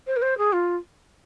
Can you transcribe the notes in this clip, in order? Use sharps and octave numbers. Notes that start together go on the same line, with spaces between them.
C5
A#4
C5
G#4
F4